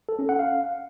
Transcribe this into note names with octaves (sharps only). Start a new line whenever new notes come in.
A4
C#4
F#5
F5